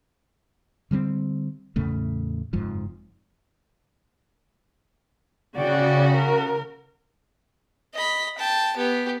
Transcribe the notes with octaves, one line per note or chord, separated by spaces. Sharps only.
D3 G3 A3 C4
E2 A2 C#3 A3
F#1 F2 G#2 F3
C#3 F#4 D5 G5
A#4
D#5 B5
G5 A5
B3 G4